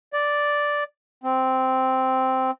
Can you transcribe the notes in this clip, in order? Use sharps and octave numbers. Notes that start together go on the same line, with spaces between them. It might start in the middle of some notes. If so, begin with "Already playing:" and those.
D5
C4